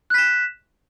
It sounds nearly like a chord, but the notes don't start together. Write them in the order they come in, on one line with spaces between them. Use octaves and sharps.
F#6 B6 E7